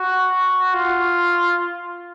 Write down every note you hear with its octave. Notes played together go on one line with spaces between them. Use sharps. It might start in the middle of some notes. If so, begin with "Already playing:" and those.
Already playing: F#4
F4